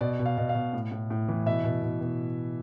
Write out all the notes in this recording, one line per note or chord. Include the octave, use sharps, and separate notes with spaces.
B2 D5
B2
F5
B2
F5
B2
A2
A2
A2
E3
B2 E5
B2
B2
B2